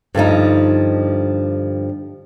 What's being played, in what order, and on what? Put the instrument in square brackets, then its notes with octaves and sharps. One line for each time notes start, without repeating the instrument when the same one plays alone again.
[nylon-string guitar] G2 D3 F3 D#4